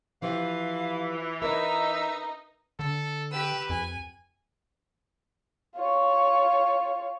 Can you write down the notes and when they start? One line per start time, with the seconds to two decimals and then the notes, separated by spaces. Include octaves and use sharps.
0.22 E3 F3 F4 G4 F5
1.42 D#4 A#4 B4 E5
2.79 D3 A4
3.32 G4 B4 E6
3.70 F2 G#5
5.76 F4 C#5